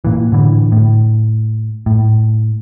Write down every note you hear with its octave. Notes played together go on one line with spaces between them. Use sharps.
A#2 E3
A2 D3 E3
A2
A2